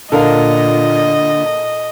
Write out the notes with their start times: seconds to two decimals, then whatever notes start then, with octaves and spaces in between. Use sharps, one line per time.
0.12 A#2 D3 A4 A#4 D#5 F5